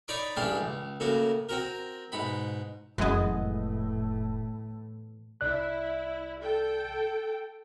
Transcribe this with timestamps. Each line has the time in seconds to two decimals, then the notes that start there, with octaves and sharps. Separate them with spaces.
0.08 D#4 C#5 D5 B5 C#6 D6
0.36 A1 G2 G#3 D4 F5 G5
0.60 C#2
1.00 A2 C#3 A#3 F#4
1.49 C4 F#4 A#4
2.12 G#2 B2 B5
2.98 F1 F#2 A2 E3 G#3 B3 D#5
5.41 C2 E4 D5 F#6
6.41 A4 G5